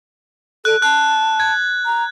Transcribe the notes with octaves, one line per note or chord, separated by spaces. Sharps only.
A4 F#6
A5 F#6
G#6
A#5